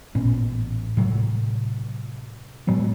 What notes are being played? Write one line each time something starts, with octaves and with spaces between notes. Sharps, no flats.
A1 A#2 B3 C#4
A2 C3 F#3
A2 F#3 G#3 B3